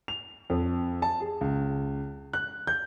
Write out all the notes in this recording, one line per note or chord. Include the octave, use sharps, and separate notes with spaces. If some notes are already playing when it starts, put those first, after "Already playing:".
F7
F2
A5
G#4
C#2
F#6
G6